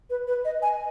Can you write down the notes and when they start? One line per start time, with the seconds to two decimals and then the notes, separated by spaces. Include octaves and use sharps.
0.10 B4
0.27 B4
0.45 D#5
0.62 G#5